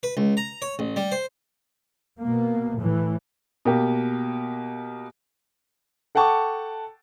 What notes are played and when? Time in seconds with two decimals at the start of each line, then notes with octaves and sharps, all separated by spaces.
0.03 B4
0.17 C#2
0.37 A#5
0.62 C#5
0.79 A1
0.96 G3
1.12 C5
2.20 B2 A#3
2.76 A2 E3
3.65 B2 A#3 G4
6.15 A4 F#5 G5 A5 C#6 D6